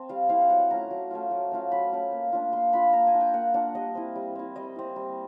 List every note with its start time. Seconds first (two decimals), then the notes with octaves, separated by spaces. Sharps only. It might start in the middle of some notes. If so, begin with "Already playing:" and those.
Already playing: C4 A5
0.09 G3 F5
0.29 C4 E4 F5
0.41 F5
0.50 F#3 F#5
0.71 A3 C#4 F4 A#5
0.91 F#3
1.11 A3 C#4 F4
1.31 F#3
1.51 A3 C#4 F4
1.72 F#3 B5
1.92 A3 C#4 F4
2.12 A#3
2.33 D4 F4
2.53 A#3 C6
2.73 D4 F4 B5
2.93 A#3 A#5
3.07 G#5
3.14 D4 F4
3.21 G5
3.34 A#3 F#5
3.54 D4 F4 F#5
3.75 G3 D#5
3.95 C4 E4
4.16 G3
4.36 C4 E4
4.56 G3 D#5
4.76 C4 E4
4.96 G3